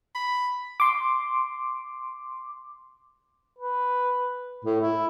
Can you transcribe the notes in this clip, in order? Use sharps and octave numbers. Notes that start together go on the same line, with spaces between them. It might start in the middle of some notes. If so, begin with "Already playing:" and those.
B5
C6 D6
B4
A2
E4